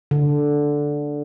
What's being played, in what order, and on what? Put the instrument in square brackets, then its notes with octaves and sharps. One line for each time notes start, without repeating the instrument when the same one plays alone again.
[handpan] D3